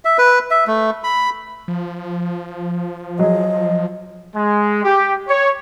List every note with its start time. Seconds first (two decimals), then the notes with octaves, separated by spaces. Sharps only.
0.05 E5
0.18 B4
0.51 E5
0.67 A3
1.04 B5
1.68 F3
3.19 F#3 G#4 D#5
4.35 G#3
4.84 G4
5.28 C#5